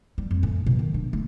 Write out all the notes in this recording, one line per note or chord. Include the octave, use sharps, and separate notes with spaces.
G3
F2
A2
B2
D#3
D4
A3